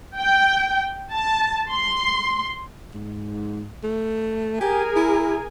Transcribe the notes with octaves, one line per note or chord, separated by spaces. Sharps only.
G5
A5
C6
G#2
A3
G4 G#4 A#4 G#5
E4